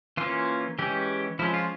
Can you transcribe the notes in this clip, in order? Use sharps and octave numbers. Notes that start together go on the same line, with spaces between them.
E3 A#3 C#4 F4
E3 G#3 C#4 G4
F3 G#3 C#4 E4
F4